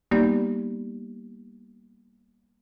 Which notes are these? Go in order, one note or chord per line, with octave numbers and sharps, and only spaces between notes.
G3 A#3 B3 D#4 G4 D5